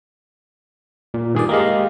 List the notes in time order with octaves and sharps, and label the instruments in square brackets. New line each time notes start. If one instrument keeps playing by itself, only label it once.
[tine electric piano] A#2
[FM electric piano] G2 D5 [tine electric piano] D#3 G#4
[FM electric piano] G#3 A#3 [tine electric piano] G4 D#5 F5